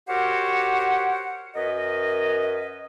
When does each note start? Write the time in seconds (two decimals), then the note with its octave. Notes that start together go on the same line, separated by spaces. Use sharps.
0.08 F#4 G4 A#4 C5 C#5 F#5
1.55 F#2 A#4 B4 D#5